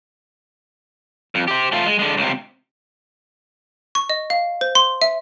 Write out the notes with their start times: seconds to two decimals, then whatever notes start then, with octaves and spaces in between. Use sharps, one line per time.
1.35 F2
1.48 G4 C5
1.72 A3 F4
1.86 G#3
1.99 D3 G#3
2.17 C#2 C3
3.95 C#6
4.09 D#5
4.30 F5
4.61 C5
4.75 C6
5.02 E5